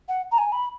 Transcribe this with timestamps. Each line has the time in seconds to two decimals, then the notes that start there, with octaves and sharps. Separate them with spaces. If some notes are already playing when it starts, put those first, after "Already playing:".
0.09 F#5
0.32 A#5
0.38 G#5
0.52 B5